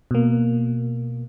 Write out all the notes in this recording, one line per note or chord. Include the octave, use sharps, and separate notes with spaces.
B2 A#3